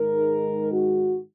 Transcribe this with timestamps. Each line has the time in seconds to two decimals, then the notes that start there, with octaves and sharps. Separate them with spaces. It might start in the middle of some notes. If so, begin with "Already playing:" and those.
Already playing: G#2 D#3 G#3 D#4 A#4
0.72 F#4